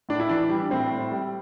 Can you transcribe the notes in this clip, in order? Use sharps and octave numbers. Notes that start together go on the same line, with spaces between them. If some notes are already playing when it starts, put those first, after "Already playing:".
A2 D4
E4
E3 D4
G3
A2 C4
A2
G3